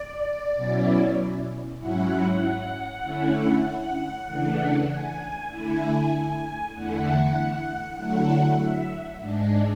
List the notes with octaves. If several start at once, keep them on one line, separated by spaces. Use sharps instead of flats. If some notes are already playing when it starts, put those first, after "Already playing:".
Already playing: D5
B2 F#3 C#4 E4
G#2 F#3 C#4 E4 F#5
F#5
D3 A3 C#4 E4
F#5
C#3 E3 A3 D4
G#5
D3 A3 E4 G#5
E2 D3 A3 E4 F#5
D3 F#3 A3 E4 F#5
E5
G#2 G#3 D4